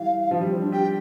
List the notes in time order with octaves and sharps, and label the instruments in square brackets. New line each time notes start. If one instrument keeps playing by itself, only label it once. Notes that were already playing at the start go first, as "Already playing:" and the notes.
Already playing: [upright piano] E3 G3 [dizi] F5
[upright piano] F3
G3
C4
D4
[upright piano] G4 [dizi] G5